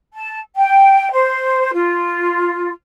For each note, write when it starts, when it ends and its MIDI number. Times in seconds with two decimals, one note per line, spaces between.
0.14 0.40 81
0.55 1.10 79
1.11 1.70 72
1.73 2.71 65